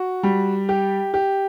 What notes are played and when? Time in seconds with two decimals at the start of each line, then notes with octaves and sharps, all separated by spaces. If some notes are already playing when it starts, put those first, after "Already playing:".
Already playing: F#4
0.23 G3
0.69 G4
1.14 G4